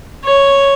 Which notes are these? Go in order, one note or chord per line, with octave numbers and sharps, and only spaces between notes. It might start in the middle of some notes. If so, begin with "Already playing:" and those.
C#5